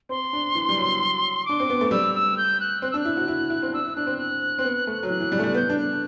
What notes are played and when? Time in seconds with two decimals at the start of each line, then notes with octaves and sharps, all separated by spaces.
0.09 C4 C6
0.33 D4
0.55 E3
0.69 G3
0.77 F#3
1.01 F#3
1.45 D4 D6
1.60 C4
1.70 B3
1.81 A3
1.91 G3 E6
2.15 E6
2.37 G6
2.60 F#6
2.82 C4 F#6
2.91 D4 E6
2.99 F#6
3.05 E4
3.17 F#4
3.28 E4
3.50 E4
3.62 C4
3.73 D4 E6
3.84 E4
3.96 D4 F#6
4.07 C4
4.18 F#6
4.59 C4
4.65 B3
4.87 A3
5.03 F#3
5.09 E3 F#6
5.20 E3
5.32 G3
5.39 A3
5.44 G3
5.47 F#6
5.54 B3 G6
5.69 D4
5.78 F#6